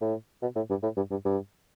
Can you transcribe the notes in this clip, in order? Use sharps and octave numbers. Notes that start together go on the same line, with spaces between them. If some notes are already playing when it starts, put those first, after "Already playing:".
A2
B2
A2
G2
A2
G2
G2
G2